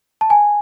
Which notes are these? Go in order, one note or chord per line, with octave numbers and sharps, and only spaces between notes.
A5
G#5